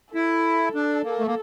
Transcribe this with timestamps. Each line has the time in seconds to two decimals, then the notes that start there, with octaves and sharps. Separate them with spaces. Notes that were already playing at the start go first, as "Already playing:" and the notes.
0.14 E4 A4
0.75 D4
1.04 A#3
1.19 A3
1.27 A#3